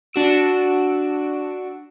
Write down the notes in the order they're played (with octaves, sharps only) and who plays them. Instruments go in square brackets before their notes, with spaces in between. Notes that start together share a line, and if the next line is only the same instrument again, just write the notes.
[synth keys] D4 F#4 E6 D7